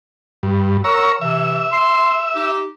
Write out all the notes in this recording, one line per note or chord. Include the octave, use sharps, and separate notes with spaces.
G2
A#4 C#5 F#5 A#5 E6
C3 E3 E5
C6
D#4 G4